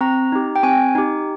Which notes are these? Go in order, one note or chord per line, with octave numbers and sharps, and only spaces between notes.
C4 A#5
D#4 G4
G5
C4 G#5
D#4 G4